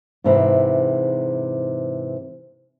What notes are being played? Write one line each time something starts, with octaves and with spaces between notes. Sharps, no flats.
G#2 C3 E3